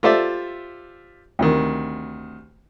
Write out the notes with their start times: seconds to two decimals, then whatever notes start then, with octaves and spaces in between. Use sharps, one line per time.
0.03 F4 G4 A4 C5 D5 E5
1.39 D2 C3 D#3